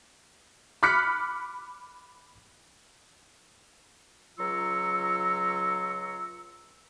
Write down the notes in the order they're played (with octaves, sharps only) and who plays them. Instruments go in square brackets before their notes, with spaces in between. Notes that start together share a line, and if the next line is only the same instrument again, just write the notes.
[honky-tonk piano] B5 D6 F6 F#6 B6 C#7
[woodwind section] C#2 F#3 F4 A#5 C#6 E6